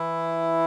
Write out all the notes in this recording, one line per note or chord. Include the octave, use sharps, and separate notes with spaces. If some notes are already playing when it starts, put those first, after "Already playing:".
Already playing: E3 E4